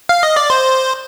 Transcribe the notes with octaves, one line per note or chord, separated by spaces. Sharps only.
F5
D#5
D5
C5